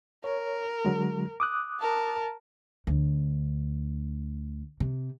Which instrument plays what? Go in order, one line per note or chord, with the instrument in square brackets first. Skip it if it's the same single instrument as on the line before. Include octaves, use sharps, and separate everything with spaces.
[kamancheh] A#4 [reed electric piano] C#5
[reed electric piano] D3 F#3 G#3
D6 D#6 F#6
[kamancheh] A#4 A5
[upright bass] D2
C3